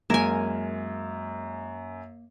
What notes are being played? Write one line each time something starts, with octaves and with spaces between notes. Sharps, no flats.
F#2 G#3 A#3 A#4 G#5 G#6 E7